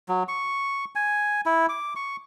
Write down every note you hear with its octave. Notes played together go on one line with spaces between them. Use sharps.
F#3
C#6
G#5
E4
D6
C#6